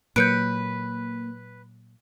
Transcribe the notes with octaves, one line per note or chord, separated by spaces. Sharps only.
A#2 F#3 A#3 B4 G6 C#7 D7